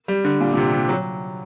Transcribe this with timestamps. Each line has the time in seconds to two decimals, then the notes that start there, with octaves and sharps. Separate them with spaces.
0.08 G3
0.25 D3
0.40 A#2
0.53 A#2
0.57 C3
0.73 C3
0.89 F#3